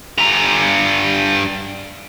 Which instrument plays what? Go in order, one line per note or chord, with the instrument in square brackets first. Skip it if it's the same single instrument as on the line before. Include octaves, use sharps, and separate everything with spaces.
[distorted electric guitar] G2 A#5